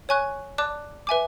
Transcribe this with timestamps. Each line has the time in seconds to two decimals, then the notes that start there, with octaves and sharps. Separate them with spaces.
0.09 C#5 G#5 C#6 F#6
0.58 D5 A5 D6 F#6
1.07 B4 E5 G#5 D6